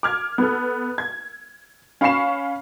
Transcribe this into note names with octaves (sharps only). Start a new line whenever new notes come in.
D6 F6 G#6
B3 A4
G#6
C#4 F5 B5 C#6 C7 E7